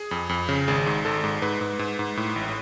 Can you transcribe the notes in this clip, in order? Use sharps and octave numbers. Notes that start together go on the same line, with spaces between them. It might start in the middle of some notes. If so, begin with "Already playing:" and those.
Already playing: G#4
F2
F2
C#3
G#1 G#4
G#2
G#1 A4
G#2
G#2 B4
G#2
G#2
G#2
A2
A1